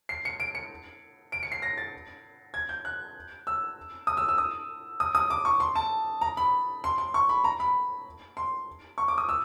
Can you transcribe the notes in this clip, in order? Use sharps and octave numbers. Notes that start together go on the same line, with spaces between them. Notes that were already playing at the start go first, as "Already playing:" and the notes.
C7
C#7
D7
C#7
D7
C#7
C7
A#6
A6
G#6
G6
F#6
E6
D#6
E6
E6
D#6
D#6
D#6
D6
C#6
C6
A5
A#5
B5
C6
C6
C#6
B5
A#5
B5
C6
C#6
D6
D#6
E6